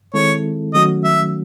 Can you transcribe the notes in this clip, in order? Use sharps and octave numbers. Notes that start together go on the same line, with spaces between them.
D#3 G#3 C4 E4 A4 C#5
D#3 F#3 A3 C#4 F#4 D#5
E5